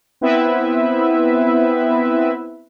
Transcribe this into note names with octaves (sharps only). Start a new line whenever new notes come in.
B3 C4 E4 B4 E5